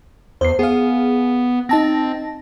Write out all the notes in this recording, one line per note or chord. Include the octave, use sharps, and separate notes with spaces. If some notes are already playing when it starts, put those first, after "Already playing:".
E2 C5 C7
B3 G#4 F5
C4 D#4 A5 A#6